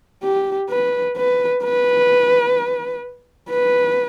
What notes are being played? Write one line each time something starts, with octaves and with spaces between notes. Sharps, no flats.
G4
B4
B4
B4
B4